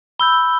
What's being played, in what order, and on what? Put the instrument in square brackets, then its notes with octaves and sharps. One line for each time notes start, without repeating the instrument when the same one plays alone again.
[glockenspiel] B5 E6 G6 G7